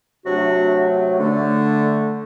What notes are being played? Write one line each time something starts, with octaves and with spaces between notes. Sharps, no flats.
C3 F#3 A3 D4 F#4
D3 A3